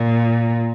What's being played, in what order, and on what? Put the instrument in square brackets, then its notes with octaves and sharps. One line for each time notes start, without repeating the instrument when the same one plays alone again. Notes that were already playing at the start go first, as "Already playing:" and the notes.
Already playing: [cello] A#2